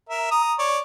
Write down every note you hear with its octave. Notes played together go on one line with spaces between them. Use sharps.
A#4 E5
A#5 D#6
C#5 D5